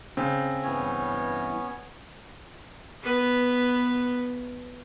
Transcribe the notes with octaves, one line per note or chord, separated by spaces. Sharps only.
C#3 C4
G2 E3 B3 C#4 E4 C#5
B3 B4